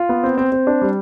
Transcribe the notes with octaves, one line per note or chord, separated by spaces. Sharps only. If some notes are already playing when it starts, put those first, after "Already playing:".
Already playing: F4
B3
C4
C4
C4
D4
G3